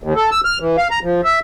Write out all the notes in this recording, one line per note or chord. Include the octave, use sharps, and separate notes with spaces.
D#2
A4
E6
F6
E3
F5
A#5
F3
E5